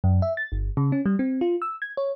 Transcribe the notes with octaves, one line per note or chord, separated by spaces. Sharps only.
F#2
E5
A6
G1
C#3
C#4
G3
C4
F4
E6
G#6
C#5